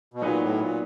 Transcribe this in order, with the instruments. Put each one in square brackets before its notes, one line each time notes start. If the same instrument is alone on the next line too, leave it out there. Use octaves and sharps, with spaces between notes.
[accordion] B2
[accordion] A#2 [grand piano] F#3 B3 D#4 G#4 B4
[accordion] A2
A#2